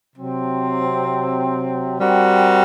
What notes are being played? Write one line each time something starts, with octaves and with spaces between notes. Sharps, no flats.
C3 F#3 C4
G3 C4 F#4 A#4